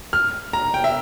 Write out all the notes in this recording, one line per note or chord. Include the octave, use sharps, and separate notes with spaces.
F6
A#5
G5
E5